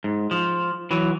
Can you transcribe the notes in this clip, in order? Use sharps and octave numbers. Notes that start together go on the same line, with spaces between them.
G#2
F3
E3 F#3